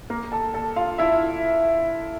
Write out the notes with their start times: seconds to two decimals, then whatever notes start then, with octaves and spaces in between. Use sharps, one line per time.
0.10 A#3 A#4
0.32 A4 A5
0.54 A4 A5
0.76 F4 F5
0.98 E4 E5